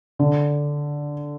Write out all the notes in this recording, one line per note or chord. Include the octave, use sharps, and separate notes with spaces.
D3